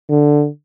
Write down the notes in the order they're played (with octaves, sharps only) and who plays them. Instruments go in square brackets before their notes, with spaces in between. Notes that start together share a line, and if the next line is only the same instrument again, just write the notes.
[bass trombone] D3